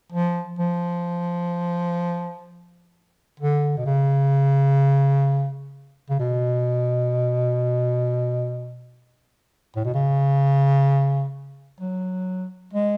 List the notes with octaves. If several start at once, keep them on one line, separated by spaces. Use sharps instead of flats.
F3
F3
D3
B2
C#3
C#3
B2
A2
B2
C#3
F#3
G#3